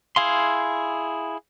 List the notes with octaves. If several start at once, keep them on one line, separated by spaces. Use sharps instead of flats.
E4 G#4 F5 C6